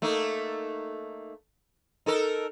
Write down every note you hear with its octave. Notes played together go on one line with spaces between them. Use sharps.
A3 A#3 D#4
D#4 A4 A#4